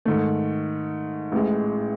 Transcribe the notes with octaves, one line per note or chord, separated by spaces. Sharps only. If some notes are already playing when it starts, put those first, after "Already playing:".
G#2 D#3 A3
A1 A2 G#3